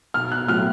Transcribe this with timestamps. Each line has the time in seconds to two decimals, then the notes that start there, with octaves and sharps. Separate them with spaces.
0.14 B1 F6
0.32 F#6
0.48 A2 F#3 F6